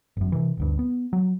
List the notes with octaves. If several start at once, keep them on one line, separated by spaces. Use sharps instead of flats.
G1 F#2
C3 E3
G1 D2 G2
B3
F#3